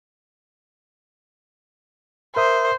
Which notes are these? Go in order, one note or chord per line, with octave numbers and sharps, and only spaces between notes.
A#4 C5 E5 D#6